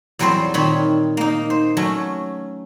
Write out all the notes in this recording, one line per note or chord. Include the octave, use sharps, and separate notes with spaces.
E2 F#3 G3 C4 C5 D5
A#2 D#3 C4 C#5 B5
A#3 D#4
C5
F#3 A3 C#4